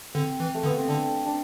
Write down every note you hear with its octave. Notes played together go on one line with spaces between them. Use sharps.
D3 C4
E3
A3
D3 B3
C4
D3 D4
D4